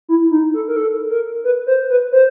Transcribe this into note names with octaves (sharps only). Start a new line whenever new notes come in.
E4
D#4
A4
A#4
A4
A#4
B4
C5
B4
C5